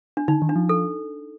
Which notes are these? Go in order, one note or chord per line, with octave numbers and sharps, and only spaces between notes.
D4
D3 D#4
D#3
D4
F3
A4